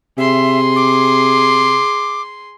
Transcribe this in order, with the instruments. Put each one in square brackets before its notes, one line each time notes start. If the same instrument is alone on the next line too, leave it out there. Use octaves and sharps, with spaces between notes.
[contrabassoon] C3 [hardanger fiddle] G#4 C6 [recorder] E5
[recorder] D6